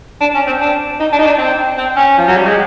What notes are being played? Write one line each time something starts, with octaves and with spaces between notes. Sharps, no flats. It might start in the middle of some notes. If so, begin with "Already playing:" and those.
D4
C#4
C4
D4
D#4
D4
D#4
D4
C4
C4
C#4
F3
F#3
G3
G#3